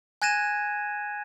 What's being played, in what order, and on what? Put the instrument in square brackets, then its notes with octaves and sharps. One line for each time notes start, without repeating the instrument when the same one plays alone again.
[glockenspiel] G#5 F#6 G#6 A#6 D#7 E7